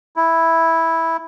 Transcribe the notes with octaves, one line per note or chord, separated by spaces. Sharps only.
E4